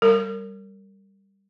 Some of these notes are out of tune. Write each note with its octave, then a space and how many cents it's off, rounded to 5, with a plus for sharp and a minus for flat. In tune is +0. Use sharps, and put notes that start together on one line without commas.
G3 +0 A#4 -25